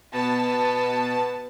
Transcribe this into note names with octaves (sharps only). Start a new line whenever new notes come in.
B2 B3 A5